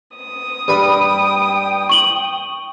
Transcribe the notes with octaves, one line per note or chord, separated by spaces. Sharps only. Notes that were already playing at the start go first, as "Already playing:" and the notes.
D#6
G2 G3 B4 G5
C#6 F#7 G7